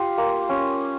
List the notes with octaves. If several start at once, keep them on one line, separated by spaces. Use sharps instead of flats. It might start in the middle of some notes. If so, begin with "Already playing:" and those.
Already playing: F4 G4
A#3
C#4